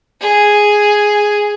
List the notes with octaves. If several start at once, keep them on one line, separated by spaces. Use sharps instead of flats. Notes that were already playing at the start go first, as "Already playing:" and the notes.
G#4